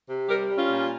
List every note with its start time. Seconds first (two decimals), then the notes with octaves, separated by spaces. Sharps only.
0.09 C3
0.29 G3 G4 A#4
0.50 G3
0.57 C#4 F4
0.71 A#2